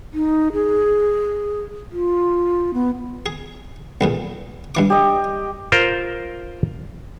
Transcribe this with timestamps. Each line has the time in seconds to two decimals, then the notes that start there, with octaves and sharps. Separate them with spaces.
0.14 D#4
0.53 G#4
1.91 F4
2.74 B3
3.26 G#4
4.01 B1 E2 A#2
4.75 G2 E3 D6
4.90 G4 D#5
5.72 F4 A#4 C5